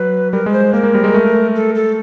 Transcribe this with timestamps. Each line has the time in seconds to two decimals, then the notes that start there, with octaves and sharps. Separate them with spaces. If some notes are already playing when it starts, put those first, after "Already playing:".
Already playing: F#3 B4
0.33 G3 A#4
0.46 G#3 B4
0.53 C5
0.73 A#3 A#4
0.84 A#3
0.94 G3
1.04 G#3
1.14 A3
1.56 A4
1.75 A4